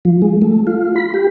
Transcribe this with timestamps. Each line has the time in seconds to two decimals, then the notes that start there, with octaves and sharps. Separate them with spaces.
0.05 F3
0.22 G#3
0.42 A3
0.67 F4
0.96 B5
1.14 G4